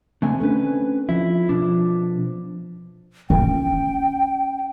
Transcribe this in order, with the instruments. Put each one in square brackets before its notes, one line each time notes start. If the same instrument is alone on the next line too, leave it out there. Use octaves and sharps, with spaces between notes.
[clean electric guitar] D3 A3 G#5 [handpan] C4
[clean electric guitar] C#4 B4 [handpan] D4 A4
[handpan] F3 [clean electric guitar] E4
[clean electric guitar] B2 D4 [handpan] F3
[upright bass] C#4 [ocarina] G5